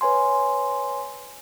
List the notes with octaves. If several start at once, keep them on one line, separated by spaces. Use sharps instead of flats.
B4 C#5 G#5 C6